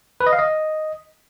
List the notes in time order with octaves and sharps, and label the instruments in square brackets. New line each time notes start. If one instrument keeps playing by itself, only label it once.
[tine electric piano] B4
D#5
F5
D#5